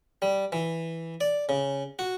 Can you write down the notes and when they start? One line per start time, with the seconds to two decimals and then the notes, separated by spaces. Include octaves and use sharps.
0.22 G3
0.52 E3
1.21 D5
1.49 C#3
1.99 F#4